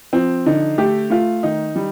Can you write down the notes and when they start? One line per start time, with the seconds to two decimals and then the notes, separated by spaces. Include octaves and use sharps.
0.13 F3 C4
0.46 D3 D#4
0.78 A3 G4
1.10 A3 F4
1.43 D#3 D#4
1.76 G3